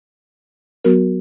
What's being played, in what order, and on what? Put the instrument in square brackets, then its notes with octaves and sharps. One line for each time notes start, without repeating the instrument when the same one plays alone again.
[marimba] F#3 B3 F#4 A#4